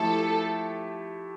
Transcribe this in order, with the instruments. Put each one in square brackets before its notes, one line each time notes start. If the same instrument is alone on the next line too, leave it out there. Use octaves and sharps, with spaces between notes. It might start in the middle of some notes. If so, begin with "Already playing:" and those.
Already playing: [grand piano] F3 A3 E4 G4 [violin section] A4